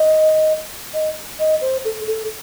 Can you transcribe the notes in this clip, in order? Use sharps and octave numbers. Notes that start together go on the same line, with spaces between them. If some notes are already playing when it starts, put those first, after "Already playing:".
Already playing: D#5
D#5
D#5
C5
A4
A4